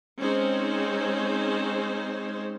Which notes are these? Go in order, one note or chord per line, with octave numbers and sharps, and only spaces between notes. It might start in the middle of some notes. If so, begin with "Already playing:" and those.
G#3 C4 C#4 D#4 C5